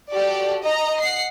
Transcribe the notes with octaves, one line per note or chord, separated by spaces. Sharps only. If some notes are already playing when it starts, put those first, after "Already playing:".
F#4 G4 A4 D5
D#5 A#5
F#5 C7